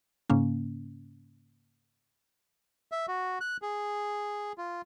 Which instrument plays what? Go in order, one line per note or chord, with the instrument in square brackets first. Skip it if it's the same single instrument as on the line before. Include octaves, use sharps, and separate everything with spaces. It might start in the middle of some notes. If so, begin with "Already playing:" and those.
[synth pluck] G#2 C#3 A#3 C#4
[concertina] E5
F#4
F#6
G#4
F4